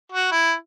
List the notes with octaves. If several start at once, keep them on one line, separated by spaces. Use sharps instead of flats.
F#4
E4